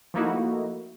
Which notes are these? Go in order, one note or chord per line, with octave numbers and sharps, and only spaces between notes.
F3 A3 A#3 D#4 E4 F#4